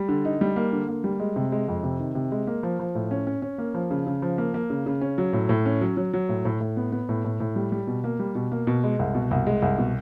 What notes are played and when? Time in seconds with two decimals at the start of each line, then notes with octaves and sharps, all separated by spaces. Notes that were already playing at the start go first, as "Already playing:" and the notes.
Already playing: G3
0.09 D3
0.25 D#4
0.41 G3
0.56 A#3
0.72 D3
0.88 A#3
1.04 G3
1.20 G#3
1.36 C3
1.52 G#3
1.68 F2
1.83 C3
2.00 D#3
2.15 C3
2.32 G#3
2.47 A#3
2.63 F3
2.80 F3
2.95 A2
3.11 C#4
3.27 C#4
3.42 C#4
3.58 A#3
3.75 F3
3.91 C#3
4.07 C#3
4.22 F3
4.38 A#3
4.54 A#3
4.70 C#3
4.86 C#3
5.01 C#4
5.18 F#3
5.33 A2
5.49 A2
5.66 C#4
5.81 F#3
5.97 F#3
6.13 F#3
6.29 A2
6.45 A2
6.60 A2
6.77 B3
6.92 B3
7.09 A2
7.24 A2
7.40 A2
7.56 G3
7.72 G3
7.87 B2
8.04 A#3
8.19 G3
8.35 B2
8.51 A#3
8.67 B2
8.84 G#3
8.99 C2
9.15 B2
9.31 C2
9.47 G#3
9.62 C2
9.78 B2